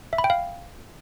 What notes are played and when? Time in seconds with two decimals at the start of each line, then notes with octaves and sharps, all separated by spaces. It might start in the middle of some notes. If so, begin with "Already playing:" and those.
0.13 E5
0.18 B5
0.24 G5
0.30 F5